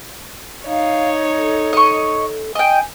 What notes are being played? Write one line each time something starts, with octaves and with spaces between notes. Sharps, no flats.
D#4 C#5 F5
A4
D#5 C#6
D#5 G5 G#5